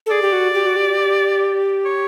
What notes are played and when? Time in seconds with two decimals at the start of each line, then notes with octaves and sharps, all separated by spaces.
0.06 A4
0.11 G#4 D5
0.22 G4
0.33 F#4
0.54 G4
0.66 F#4
0.76 G4
1.85 C#5